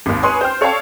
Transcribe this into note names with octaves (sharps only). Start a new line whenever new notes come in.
G#1 D#2
B4 C#5 G#5 C6 D#6
C5 G5 F6
A4 C#5 D5 F5 G5 A5